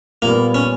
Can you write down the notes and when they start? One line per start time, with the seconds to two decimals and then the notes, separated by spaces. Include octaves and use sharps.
0.22 A#2 G3 A#3 B3
0.54 C#4